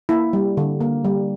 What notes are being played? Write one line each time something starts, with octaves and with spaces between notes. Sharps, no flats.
A#3 E4
G3
D3
A#3
G3